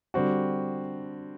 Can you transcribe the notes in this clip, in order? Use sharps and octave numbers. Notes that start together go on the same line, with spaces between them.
D3 G3 C4 F#4